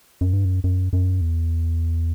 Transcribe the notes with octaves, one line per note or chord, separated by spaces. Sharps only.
F#2
G2
F#2
F#2
F#2
E2